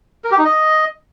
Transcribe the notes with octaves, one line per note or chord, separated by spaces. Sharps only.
A#4
G4
D#4
D#5